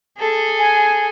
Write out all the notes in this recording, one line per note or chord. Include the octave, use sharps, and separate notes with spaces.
G#4 A4
G#5